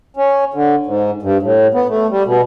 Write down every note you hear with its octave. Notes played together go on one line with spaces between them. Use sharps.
C#4
D3
G#2
G2
A2
B3
A3
G3
B2